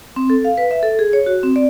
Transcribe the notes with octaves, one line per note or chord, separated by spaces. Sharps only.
C4
A4
F5
B4
E5
A4
G#4
C#5
F#4
C4
D5